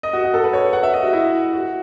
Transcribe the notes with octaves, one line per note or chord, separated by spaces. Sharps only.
D#5
F#4
F#4
A4
B4
C#5
F#5
E5
D#5
F#4
E4
F#4